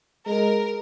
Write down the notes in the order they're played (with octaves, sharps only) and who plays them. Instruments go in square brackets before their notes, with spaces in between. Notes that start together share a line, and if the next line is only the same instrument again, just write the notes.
[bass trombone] G#3 [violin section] A#4